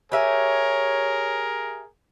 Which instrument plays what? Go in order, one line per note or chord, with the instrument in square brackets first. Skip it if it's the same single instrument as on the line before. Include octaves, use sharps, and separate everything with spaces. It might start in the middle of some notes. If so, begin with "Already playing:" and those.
[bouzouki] G4 E5 G#5 [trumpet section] G#4 A#4 [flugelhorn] C#5